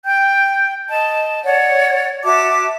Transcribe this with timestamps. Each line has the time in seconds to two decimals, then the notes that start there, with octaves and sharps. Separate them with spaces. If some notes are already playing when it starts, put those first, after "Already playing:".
0.04 G5 G6
0.89 D#5 A5
1.45 C#5 D5 F#5
2.24 F#4 E5 A5 D6